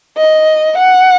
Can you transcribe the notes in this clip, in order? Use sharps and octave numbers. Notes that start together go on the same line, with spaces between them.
D#5
F#5